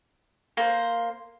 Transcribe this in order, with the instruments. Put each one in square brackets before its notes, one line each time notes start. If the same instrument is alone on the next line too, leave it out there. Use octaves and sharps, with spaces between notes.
[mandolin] A#3 C5